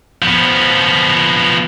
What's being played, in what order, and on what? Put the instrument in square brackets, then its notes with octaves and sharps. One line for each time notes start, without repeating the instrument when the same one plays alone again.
[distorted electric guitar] F3 B3